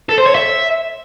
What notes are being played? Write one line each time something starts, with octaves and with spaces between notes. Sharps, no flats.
A4
C5
C#5
E5